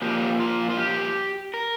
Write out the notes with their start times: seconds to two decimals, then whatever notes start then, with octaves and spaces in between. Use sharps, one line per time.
0.02 A#2 F3 A#3 G4
0.40 F4
0.70 F4
0.77 G4
1.54 A#4